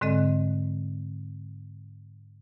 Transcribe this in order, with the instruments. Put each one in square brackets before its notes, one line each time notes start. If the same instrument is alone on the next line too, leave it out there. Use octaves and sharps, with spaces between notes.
[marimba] G#2 D3 G#3 C4 A4 D#5